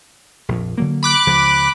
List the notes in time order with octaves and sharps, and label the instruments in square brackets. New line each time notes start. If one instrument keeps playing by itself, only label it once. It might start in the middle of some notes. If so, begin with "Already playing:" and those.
[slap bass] A#1 F2
D3 F#3 A#3
[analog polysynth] B5 D6 F#6
[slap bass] C#2 F3